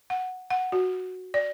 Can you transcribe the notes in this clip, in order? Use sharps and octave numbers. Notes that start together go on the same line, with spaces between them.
F#5
F#5
F#4
D5